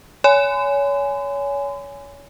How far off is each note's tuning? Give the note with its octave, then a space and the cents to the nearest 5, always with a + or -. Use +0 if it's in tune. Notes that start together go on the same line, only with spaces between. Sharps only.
C#5 +30 G#5 +0 C6 -45